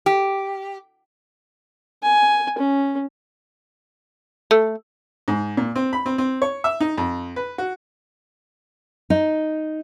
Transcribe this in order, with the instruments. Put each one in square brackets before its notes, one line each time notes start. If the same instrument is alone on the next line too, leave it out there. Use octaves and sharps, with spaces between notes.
[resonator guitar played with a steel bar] G4
[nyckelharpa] G#5
C#4
[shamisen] A3
[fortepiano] G#2
A#2
C4
B5
C4
C4
C#5
E5
D#4
F2
B4
F#4
[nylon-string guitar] D#4